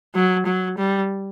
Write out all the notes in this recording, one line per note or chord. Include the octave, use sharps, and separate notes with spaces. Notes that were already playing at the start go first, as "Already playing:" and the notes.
F#3
F#3
G3